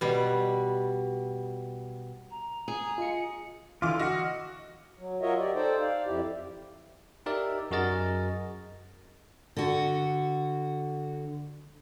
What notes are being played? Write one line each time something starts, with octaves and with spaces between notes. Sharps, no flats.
B2 G3
A#5
G#4
F4 D#5 C#7
D3 E3 F4 F5 D6 F6
F#4 D#5 E5 F#5
F#3
F4 F#4 A#4 C#5 D#5 E5
G4 D5
D#4 A4 C5 D5 G5
D5 F5
F2 E4 G4
D#4 G4 A#4 D5 E5
F#2 F#4 G#4 A#4 D#5 A6
D3 F#4